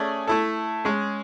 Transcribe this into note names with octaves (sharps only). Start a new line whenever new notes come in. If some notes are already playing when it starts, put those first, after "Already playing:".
Already playing: A3 C#4 G#4 D5
A3 E4 A4
G#3 C#4 G#4